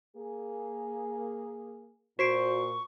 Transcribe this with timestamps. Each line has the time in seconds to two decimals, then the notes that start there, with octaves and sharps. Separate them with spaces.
0.16 A#3 G#4
2.19 A#2 F#4 C5 C#6 C7 D7